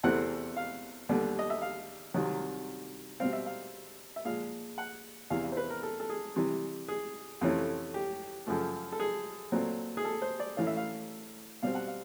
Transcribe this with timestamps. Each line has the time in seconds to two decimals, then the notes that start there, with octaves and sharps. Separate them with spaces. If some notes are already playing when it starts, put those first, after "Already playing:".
0.03 E2 C3 E3 A3 C4 F#5
0.56 F5
1.09 D#2 D3 G3 B3
1.39 D#5
1.50 E5
1.62 F5
2.14 C2 C3 D#3 F#3
3.20 B2 G3 C4 F5
3.33 E5
3.46 F5
4.16 E5
4.25 A#2 F3 G#3 F5
4.78 F#5
5.30 E2 C3 E3 F5
5.44 F5
5.52 C5
5.57 B4
5.70 A#4
5.83 A4
6.00 A4
6.10 G#4
6.36 C3 E3 G3
6.88 G#4
7.41 F2 C3 E3 A3 C#4
7.94 G4
8.46 F#2 C#3 F3 A3
8.92 A4
9.00 G#4
9.52 A#2 F#3 A3 C4
9.97 G#4
10.05 A4
10.22 C5
10.40 D5
10.57 A2 E3 A3 C#4 F5
10.67 E5
10.77 F5
11.63 B2 G3 C4 F5
11.75 F#5
11.88 F5